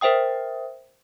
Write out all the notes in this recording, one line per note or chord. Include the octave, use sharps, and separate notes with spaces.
A#4 C5 E5 G5 D#6